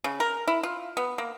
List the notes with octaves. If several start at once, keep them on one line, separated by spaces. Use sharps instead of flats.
C#3
A#4
E4
F4
B3
A#3